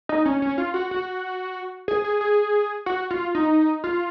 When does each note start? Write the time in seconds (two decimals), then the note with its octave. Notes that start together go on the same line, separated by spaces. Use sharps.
0.09 D#4
0.25 C#4
0.42 C#4
0.58 F4
0.74 F#4
0.91 F#4
1.88 G#4
2.04 G#4
2.21 G#4
2.86 F#4
3.11 F4
3.35 D#4
3.84 F4